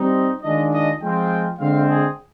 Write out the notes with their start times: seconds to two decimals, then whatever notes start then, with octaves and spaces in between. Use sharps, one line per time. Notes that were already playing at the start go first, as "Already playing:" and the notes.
Already playing: G3 C4 D#4
0.42 D#3 G#3 D4 F4 D#5
0.72 D#5
1.01 F3 G#3 C4 F4 G5
1.59 D3 G#3 C4 F5
1.89 G#4